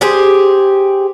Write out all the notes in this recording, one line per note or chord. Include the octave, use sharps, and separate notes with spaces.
G4 G#4 C5